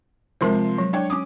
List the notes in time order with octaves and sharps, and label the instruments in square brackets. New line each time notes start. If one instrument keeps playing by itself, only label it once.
[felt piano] C3 F3 C6 [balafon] G#3 A#4 C5
[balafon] F#3
[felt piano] D4 C#5 G5
C#4 D6 D#6